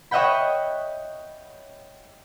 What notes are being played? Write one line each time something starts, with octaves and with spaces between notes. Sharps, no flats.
C#5 D#5 E5 F#5 G5 B5